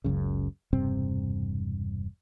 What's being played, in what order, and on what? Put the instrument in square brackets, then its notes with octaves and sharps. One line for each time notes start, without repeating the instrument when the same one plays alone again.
[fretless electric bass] F#1 C#2 F#2 C#3
E1 G2 C3 C4